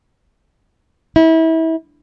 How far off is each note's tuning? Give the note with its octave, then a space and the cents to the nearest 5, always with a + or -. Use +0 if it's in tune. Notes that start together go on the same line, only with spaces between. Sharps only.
E4 -30